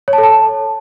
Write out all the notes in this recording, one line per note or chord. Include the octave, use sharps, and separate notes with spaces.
C#5
A5
A4
A5